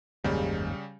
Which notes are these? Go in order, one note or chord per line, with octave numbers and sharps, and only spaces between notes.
F#1 D#2 G#2 C#3 G3